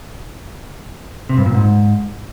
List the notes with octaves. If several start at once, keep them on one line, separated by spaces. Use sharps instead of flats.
C3
G2
A#2
G#2